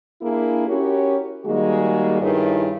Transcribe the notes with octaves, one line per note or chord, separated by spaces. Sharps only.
A#3 D4 E4 G#4 A#4
C#4 E4 F#4 G4 A#4 C#5
D#3 G3 G#3 A#3 F#4 G#4
G2 D#3 E4 G#4 B4 C#5